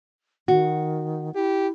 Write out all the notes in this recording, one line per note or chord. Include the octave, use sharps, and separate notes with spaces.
D#3 F#4
E4 G4